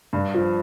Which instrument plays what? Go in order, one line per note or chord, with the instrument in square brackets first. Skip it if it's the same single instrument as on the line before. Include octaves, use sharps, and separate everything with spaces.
[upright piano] G2
F3